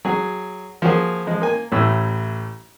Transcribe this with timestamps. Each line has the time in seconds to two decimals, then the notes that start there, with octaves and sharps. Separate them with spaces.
0.05 F#3 G#4
0.82 F3 A#3 F#4 G#4
1.27 F3 G#3
1.41 A#3 G#5
1.72 A1 A2 E6